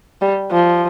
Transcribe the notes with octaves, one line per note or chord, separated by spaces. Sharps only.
G3
F3